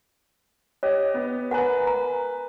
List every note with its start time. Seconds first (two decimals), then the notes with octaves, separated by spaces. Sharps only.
0.83 G4 C#5 D#5
1.14 B3
1.51 A#4 B4 F#5 G#5 A#5
1.87 A#5